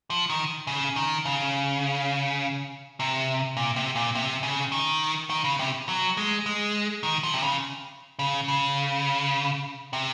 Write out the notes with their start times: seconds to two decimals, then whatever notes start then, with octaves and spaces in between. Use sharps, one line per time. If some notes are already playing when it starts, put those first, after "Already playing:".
0.10 F3
0.30 D#3
0.67 C#3
0.96 D#3
1.25 C#3
3.00 C3
3.57 A#2
3.76 C3
3.96 A#2
4.15 C3
4.43 C#3
4.72 D#3
5.30 D#3
5.44 C#3
5.59 C3
5.89 F#3
6.17 G#3
6.46 G#3
7.03 D#3
7.23 F3
7.34 C3
7.43 C#3
8.19 C#3
8.48 C#3
9.93 C3